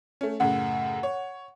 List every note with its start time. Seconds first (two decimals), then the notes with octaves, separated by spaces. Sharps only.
0.21 A3 C#4
0.40 F#2 A2 C#3 F#5
1.03 C#5